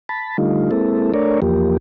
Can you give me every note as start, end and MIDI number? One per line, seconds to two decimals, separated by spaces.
0.09 0.37 81
0.09 0.37 83
0.38 0.71 50
0.38 0.71 55
0.38 0.71 57
0.38 0.71 63
0.38 0.71 65
0.71 1.12 56
0.71 1.12 58
0.71 1.12 60
0.71 1.12 64
0.71 1.12 69
1.14 1.40 57
1.14 1.40 62
1.14 1.40 70
1.14 1.40 73
1.14 1.40 74
1.42 1.77 40
1.42 1.77 53
1.42 1.77 58
1.42 1.77 67